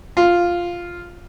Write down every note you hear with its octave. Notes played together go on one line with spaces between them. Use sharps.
F4